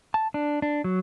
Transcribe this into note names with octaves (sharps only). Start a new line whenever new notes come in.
A5
D4
D4
F#3